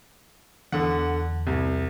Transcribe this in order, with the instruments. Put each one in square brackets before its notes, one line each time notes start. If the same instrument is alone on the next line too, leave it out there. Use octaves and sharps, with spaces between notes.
[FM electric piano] E2 [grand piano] D3 F#5
[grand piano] C2